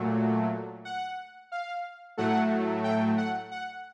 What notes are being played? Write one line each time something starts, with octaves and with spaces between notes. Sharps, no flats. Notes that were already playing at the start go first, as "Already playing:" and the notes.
Already playing: A#2 F#3 A3
F#5
F5
A2 F#3 A3 F#5
G5
F#5
F#5